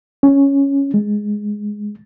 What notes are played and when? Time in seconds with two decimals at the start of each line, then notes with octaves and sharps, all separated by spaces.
0.23 C#4
0.94 G#3